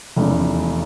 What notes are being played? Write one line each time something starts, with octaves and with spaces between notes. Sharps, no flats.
F1 E2 C#3